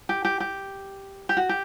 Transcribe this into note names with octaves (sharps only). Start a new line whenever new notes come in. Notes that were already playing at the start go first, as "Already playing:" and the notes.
G4
G4
G4
G4
F#4
G4